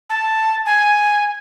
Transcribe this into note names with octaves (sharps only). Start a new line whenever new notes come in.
A5
G#5